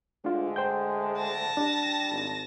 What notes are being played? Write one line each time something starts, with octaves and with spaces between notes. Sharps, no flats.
D2 D3 G#3 D4 F4
C5 G5 G6
A5 A#6
G3 D4
G#1